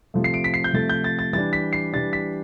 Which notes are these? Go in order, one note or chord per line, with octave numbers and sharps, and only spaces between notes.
C3 F3 A3
C7
D7
B6
C7
G6
C3 F3 A3 A6
G6
A6
A6
E3 G3 D4 A6
B6
C7
E3 G3 D4 A6
B6